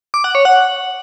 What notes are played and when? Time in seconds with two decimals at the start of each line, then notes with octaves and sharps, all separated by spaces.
0.14 D6
0.24 F#5
0.35 C#5
0.45 F#5